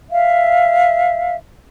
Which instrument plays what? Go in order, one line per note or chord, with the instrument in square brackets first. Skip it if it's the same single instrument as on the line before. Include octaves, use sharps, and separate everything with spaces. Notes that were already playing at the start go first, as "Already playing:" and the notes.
[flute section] E5 F5